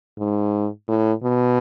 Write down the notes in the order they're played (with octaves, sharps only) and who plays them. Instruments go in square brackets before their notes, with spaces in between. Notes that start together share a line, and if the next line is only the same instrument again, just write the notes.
[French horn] G#2
A2
B2